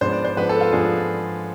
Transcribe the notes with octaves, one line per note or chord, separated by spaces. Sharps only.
G#2 F3 B3 D4 C5
D5
C5
G#2 F3 B3 D4 B4
A4
F4
G#2 F3 B3 D4 G#4